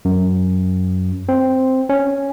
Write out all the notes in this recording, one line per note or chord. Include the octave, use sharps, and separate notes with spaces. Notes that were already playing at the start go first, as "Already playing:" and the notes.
F#2
C4
C#4